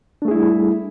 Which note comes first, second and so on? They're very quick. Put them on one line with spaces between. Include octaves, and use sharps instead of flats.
D4 A3 G#4 E4 G3